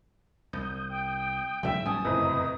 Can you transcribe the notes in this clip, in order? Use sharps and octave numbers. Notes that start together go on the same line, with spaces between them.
C2 D#6 G6
G5
G#2 C#3 E3 F#3 E5 G5
G1 A2 G3 C#4 G#5 A5 D#6
F#1 F2 A2 C3 B4 D#5 A#5